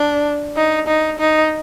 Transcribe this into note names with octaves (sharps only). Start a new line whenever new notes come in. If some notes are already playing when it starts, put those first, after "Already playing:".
Already playing: D4
D#4
D#4
D#4